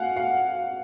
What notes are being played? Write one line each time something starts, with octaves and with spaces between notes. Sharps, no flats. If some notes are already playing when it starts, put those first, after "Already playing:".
Already playing: F5 F#5 G#5
F5